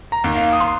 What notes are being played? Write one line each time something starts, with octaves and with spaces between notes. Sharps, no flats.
A#5
D#2 D#3
F5
D#6
C6